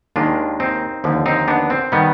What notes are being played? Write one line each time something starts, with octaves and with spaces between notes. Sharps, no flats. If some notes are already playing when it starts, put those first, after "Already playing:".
D#2 D#3 G#3 D4 F4
C4 D#4
D#2 D3 F3
C4 D#4
B3 D4
C4
D#3 G3 B3